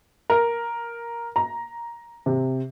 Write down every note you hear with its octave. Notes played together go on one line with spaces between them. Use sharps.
A#4
A#5
C3